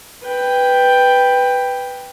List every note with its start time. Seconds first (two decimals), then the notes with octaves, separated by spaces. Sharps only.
0.24 B4 G5